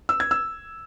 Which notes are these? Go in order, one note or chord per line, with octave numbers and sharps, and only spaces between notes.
E6
G#6
E6